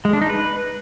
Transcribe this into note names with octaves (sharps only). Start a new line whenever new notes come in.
G#3
D4
D#4
B4